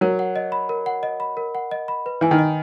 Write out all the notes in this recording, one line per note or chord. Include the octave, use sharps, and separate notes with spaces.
F#3 A#4
F#5
D#5
B5
A#4
F#5
D#5
B5
A#4
F#5
D#5
B5
B4
E3 G#5
D#3
D#5